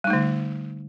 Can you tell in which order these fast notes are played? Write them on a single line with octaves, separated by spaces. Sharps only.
G3 D#4 A3 D3